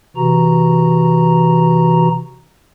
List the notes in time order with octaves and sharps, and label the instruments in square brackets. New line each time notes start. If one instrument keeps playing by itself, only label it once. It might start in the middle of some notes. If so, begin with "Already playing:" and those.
[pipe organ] C3 E3 F#4 A#5